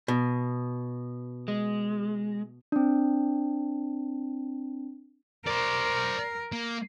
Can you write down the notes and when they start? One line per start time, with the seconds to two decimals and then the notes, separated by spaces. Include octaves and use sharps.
0.08 B2
1.48 G#3
2.72 C4 D4
5.46 A#4 C5 D5
6.52 A#3